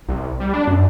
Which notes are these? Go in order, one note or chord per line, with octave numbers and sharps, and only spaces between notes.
C2
G3
D4
F#2